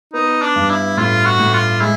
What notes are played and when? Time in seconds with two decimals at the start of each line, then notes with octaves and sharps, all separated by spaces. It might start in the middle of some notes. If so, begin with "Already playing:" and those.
0.13 B3 D#4
0.42 D4
0.56 G2
0.70 E4
0.97 A2 F4
1.25 F#4
1.39 A2
1.53 F4
1.81 G#3 E4